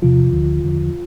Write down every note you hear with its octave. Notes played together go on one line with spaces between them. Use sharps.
E2 C3 F3 F4
D2 D3 F3
E2 D3 F3